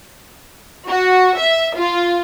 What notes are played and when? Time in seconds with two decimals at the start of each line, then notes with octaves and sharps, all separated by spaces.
0.88 F#4
1.37 E5
1.76 F4